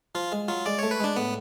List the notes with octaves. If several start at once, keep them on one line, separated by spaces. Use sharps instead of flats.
F3 F4
G#3
F#3 F4
G#3 D5
A3 C#5
B4
G#3 D4
A2 B3